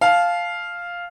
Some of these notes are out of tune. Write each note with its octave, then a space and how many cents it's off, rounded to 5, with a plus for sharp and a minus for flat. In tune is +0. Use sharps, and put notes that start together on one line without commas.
F5 +0 A5 -25